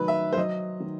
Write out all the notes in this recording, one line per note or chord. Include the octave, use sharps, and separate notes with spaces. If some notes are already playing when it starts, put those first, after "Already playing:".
Already playing: D#3 F#3 B4
E5
C5
F#3 D#5
D#3